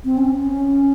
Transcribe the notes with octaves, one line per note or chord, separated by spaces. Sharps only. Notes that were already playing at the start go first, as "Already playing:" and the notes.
C4
C#4